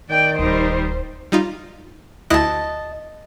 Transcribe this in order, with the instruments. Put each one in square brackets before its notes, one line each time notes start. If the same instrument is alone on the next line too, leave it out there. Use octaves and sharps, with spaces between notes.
[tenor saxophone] D#3 [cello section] D5 [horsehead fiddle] G5
[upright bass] D1 [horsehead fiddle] G3 D#4 [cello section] C5
[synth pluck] G3 D#4 F4
[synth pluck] D2 E4 F#6 [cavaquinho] D#5 A5